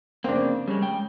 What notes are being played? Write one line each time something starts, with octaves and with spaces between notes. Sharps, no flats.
C#3 A#3 C4 D4
C#3 G3 G#3
G#3 G5